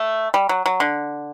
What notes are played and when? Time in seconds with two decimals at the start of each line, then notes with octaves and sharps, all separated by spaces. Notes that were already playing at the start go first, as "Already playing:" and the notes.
Already playing: A3
0.34 G3
0.49 F#3
0.66 F#3
0.80 D3